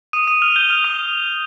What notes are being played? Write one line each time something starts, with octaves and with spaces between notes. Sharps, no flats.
D#6 D#7
D#6 D#7
F6 F7
G6 G7
F6 F7
D#6 D#7